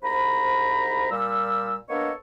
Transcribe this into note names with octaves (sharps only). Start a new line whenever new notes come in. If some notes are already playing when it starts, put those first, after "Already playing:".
C2 G#2 C5 A#5 B5
A#2 G3 E6
A#3 B3 D4 A4 C#5 D#5